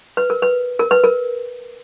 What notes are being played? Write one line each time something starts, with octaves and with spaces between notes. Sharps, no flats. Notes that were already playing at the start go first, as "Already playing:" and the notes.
B4
A#4
B4
A#4
B4
A#4